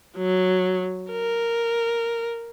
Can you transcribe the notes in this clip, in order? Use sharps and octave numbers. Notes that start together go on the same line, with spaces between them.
F#3
A#4